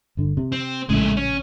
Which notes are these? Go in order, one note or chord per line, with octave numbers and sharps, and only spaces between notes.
G1 D3
C3
C4
A#1 A2 C#3 G#3 A3
C#4